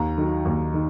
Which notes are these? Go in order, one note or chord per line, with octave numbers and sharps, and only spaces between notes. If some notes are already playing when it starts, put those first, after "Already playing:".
Already playing: D#2 A#5
D#3 F#3
D#2
D#3